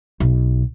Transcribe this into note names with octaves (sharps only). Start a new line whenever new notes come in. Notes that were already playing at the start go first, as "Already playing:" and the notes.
B1